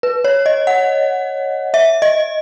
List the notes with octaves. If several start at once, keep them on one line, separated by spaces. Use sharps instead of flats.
B4
C#5
D#5
F#5
E5
D#5